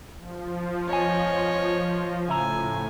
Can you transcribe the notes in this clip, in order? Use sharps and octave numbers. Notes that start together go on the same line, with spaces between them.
F3
F2 C#5 D#5 G#5
A2 C#3 E5 G#5 A#5